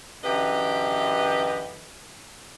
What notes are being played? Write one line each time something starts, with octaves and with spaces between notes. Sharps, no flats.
F#2 D3 E3 G4 B4 D#5